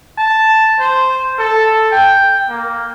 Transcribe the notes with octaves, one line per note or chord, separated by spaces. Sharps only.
A5
C5
A4
G5
A#3